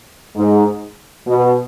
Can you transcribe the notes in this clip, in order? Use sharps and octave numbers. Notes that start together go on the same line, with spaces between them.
G#2
B2